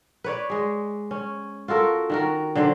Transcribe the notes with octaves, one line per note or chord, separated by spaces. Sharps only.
B4 C#5 D5
G#3 G#4
C#4
F4 F#4 A4 A#4
D#3 F#4 A#4
D3 F#3 C5 D5